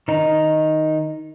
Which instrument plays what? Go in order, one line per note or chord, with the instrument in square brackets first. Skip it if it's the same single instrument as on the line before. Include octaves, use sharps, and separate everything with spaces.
[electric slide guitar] D#3 D#4